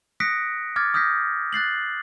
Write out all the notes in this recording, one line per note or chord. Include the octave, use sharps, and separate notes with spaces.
D#6 F#6 A#6 B6 C#7 D7
D6 F6 G#6 A6
D#6 F6 G6 A#6 B6
F#6 A6 C7 F#7